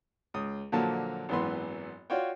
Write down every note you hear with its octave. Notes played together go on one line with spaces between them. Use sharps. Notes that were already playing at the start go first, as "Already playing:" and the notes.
C#2 D#6
A#2 D3 F3 F#3 A#3 A5
G#1 F#2 E3 B3 C6
F4 F#4 C#5 D5 G5